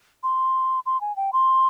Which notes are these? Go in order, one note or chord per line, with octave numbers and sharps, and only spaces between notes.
C6
C6
G#5
G5
C6